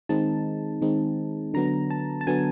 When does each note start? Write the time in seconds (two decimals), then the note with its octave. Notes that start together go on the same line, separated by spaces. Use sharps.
0.09 D#3 G#3 C4 D#4 A5
0.82 D#3 G#3 C4 D#4
1.54 D3 F#3 B3 A#5
1.90 A5
2.21 A5
2.27 D3 F#3 B3 G#5